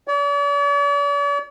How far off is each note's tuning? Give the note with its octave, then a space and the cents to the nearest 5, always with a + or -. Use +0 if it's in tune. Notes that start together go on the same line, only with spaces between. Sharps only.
D5 -45